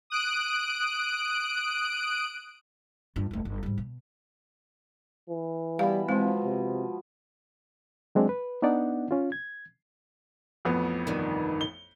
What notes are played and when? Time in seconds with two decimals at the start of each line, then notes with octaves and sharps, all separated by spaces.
0.10 D#6 F#6 D7
3.16 G2 F4
3.31 D#1 A3
3.45 G1
3.63 G#2 G3
3.78 B2
5.30 E3
5.79 B2 G3 F5 B5
6.09 B2 F3 G#3 C4
6.44 C3
8.15 F#3 G#3 C4 D4
8.29 B4
8.62 B3 D4 D#4 D5 F#5
9.11 C#4 F4
9.32 G#6
10.65 A1 F2 B3
11.07 G2 C3 D#3
11.61 G7